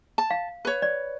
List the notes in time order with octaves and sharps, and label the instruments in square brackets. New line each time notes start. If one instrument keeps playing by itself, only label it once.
[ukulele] A5
[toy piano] F5
[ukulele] B4 C#5
[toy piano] D5